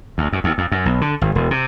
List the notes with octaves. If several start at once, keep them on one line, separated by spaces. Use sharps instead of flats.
D2
F#2
D#2
F2
F#2
B1
D3
G#1
E1
C3